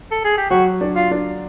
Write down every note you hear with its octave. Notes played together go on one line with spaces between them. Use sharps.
A4
G#4
G4
F#3 F#4
D4
F4
D4